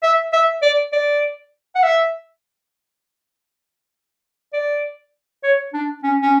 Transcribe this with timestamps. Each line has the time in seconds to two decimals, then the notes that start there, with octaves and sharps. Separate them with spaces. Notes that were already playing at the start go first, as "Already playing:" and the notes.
0.03 E5
0.33 E5
0.62 D5
0.93 D5
1.76 F#5
1.83 E5
4.53 D5
5.43 C#5
5.73 D4
6.03 C#4
6.22 C#4